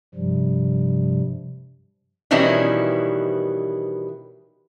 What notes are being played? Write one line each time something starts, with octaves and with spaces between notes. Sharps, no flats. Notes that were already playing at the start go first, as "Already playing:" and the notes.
G2 C3 F3 G3
B2 D#3 E3 G3 C#4 E4